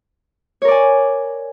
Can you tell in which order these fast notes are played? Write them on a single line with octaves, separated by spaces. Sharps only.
C#5 A#4 D5 G#5